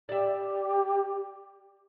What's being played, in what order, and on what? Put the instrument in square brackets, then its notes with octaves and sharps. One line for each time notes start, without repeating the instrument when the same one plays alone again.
[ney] G4 [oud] D5 E5